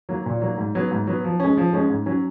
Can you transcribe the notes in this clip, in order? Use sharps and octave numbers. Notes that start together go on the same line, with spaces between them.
F#3 A#3
A#2
F#3 A#3
G#2
F#3 B3
G#2
F#3 B3
F3
G#3 C#4
F3
G#3 C#4
G#2
F#3 C#4